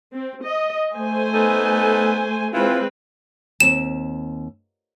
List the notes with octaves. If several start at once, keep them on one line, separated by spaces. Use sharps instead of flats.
C4
D#5
A3 C5 G#5
B3 D#4 A4
E3 G#3 C4 F4 B4
D#2 C4 E7